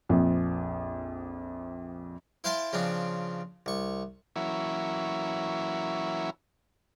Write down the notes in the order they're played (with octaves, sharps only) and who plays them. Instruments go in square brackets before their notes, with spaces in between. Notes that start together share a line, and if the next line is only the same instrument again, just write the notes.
[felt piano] A#1 F2
[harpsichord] E4 C5 F5 G5 A5 C6
C#3 F3 C4 D4
C2 C#6
[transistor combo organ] E3 F#3 A#3 C#4 E4